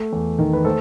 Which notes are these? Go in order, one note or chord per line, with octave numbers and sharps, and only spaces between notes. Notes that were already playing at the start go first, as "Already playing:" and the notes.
Already playing: A3
E2
D#3
B4
A3 A4 C5